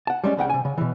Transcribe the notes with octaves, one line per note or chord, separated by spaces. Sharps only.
F#5 A5
G3 G#3 C4 C#4
C2 C#3 F#5 G5
C3 G#5
C#3
B2 E3